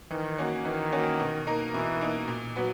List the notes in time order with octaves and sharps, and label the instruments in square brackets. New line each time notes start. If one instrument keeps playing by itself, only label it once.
[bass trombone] D#3 [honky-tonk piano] E3
[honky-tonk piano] A#3 C#4 F#4
[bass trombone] D#3 [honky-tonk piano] E3
[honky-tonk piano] A#3 C#4 F#4
B2
A#3 D#4 A#4
[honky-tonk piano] B2 [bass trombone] E3
[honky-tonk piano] A#3 D#4 A#4
A#2
F#3 B3 F#4 B4